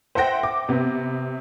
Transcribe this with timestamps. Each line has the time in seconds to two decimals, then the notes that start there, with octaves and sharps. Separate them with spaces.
0.15 C5 E5 F#5 G5 A#6
0.43 D6
0.69 C3 B3